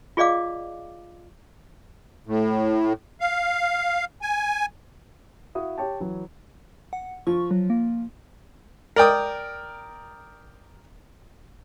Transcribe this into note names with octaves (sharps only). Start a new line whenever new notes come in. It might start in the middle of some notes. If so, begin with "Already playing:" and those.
F4 G#4 D5 D#5 F5 D6
A2
F5
G#5
E4 F#4 F5 D#6
G4 C#5 G5 A5
E3 F#3
F#5
F3 C#6
F#3
A#3
A#4 D5 G5 D#6